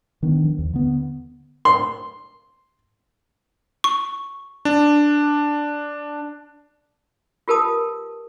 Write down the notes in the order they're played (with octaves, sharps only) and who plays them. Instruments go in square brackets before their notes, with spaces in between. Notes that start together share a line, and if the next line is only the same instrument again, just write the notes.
[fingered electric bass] D#3 B3 D4
F3
D#2
D3 B3
[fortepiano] C6
[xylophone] C#6
[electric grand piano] D4
[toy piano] F4 G4 A#4 B4 A5 D#6